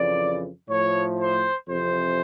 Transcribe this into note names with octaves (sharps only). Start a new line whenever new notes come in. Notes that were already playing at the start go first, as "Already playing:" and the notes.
Already playing: F2 C#3 E3 D5
A2 F3 C#5
C5
F2 C3 E3 C5